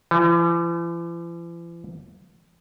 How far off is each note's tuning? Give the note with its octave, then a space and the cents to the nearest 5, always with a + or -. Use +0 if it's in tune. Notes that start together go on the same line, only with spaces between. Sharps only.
E3 +45